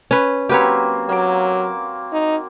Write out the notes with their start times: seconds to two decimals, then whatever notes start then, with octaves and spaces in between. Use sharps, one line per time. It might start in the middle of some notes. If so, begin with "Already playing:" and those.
0.11 C#4 B4
0.49 F#3 A#3 C4 G4 B4 C#5
1.09 F#3 A#3 D6
2.12 D#4